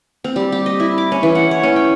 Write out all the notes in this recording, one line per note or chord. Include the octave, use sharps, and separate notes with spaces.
C4
G3
G4
D#5
E4
D6
C#4
E3
F#5
C#5
C#4
G5